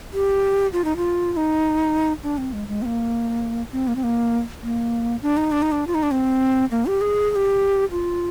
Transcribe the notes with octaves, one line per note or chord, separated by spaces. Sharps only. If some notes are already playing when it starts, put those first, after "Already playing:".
G4
F4
D#4
F4
F4
D#4
D4
C4
G#3
G#3
C4
A#3
C4
A#3
C4
A#3
A#3
D4
D#4
D4
D#4
D4
F4
D#4
D4
C4
A#3
G4
G#4
G#4
G4
F4